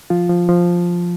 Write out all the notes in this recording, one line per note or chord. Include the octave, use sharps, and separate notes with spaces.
F3 F4
F3
F3